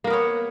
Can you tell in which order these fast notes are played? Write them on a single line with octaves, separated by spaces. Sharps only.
A#3 A#4 B3 C#5